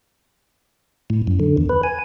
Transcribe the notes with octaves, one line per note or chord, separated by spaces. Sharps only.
A2
F#2
D3
E2
B4
G#5